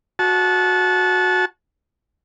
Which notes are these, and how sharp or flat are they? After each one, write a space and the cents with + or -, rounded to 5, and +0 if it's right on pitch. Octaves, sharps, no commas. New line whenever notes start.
F#4 -15 A5 -25